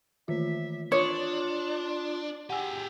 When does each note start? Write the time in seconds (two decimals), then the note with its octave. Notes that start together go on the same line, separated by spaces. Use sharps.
0.28 D#3 E3 F4 E5
0.92 D4 F4 C#5 D6 D#6
2.50 G4 G#4 F#5 G#5 E6